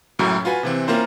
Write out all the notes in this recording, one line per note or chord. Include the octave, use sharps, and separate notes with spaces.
C#2 F#2 A2 F#3 C#4
F4 F#4 B4 G#5
C3 E3 C4
A#3 C#4 E4 F4 A#4 C5